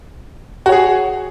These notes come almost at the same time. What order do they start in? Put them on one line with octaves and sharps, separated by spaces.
F#4 C#5 G#4